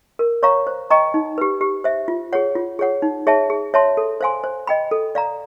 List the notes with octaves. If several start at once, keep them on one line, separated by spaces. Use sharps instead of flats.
A#4
C#5 F5 A#5 C#6
C5
D#5 G5 A#5 C#6
D#4
G4 B4
G4
C5 E5
F4
G#4 C#5 F#5
F4
G#4 C#5 F#5
D#4
G#4 C#5 E5 A5
G#4
C#5 E5 A5 C6
A4
C5 F5 G#5 C6
C5
D#5 G5 B5
A4
D5 F5 A#5